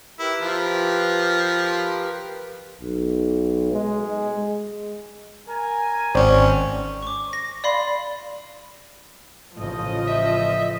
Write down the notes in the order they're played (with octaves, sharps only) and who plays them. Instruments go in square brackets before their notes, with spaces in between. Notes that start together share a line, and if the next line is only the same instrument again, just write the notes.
[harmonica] E4 [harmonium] G4 A#4 B4
[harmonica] F3
[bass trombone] B1
G#3
[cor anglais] A#4 [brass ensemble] G#5
[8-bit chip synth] G#1 C#4 [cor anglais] F#4 [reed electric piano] C5 D5 G5
[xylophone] C#6 D6
A#6
D5 F5 B5 C6 C7
[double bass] A1 C#3 [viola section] F3 D#5
[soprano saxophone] E5